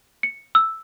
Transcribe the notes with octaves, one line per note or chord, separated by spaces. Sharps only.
C#7
E6